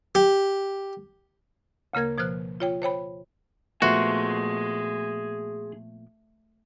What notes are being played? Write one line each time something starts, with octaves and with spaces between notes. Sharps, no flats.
G4
D2 C#3 A#3 A#4 G#6
B2 F3 C5 F6 F#6
F4 C#5 G5
C5 C#5 G5 B5
A#2 F3 A3 B3 F#4 G#4 C6